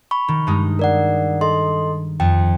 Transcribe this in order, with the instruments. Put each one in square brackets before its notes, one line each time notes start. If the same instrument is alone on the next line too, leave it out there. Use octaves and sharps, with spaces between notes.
[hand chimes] B5 C#6
[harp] D#3
G2 G#3 D#4
[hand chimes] A#4 D5 F#5
A4 D#5 C6
[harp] F2 [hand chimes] G5